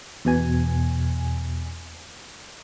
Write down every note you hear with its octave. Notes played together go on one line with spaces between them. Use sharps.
E2 B2 G#5